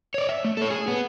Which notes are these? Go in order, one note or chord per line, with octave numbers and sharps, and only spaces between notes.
C#5 D5
E5
A3
A4 C#5
G#4
B3